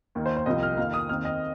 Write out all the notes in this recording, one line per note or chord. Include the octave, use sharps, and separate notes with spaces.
D#2 D#3 A#3
C5
C5
C2 C3 F3 C4 D#5
F6
F2 D#3 A#3 F5
D#6
D#2 D#3 C4 F6
D#5